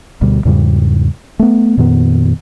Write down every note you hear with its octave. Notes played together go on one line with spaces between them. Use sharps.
D2 B2 G3
E2 G#2 C#3 G3
A3 B3
F2 A#2 D#3 B3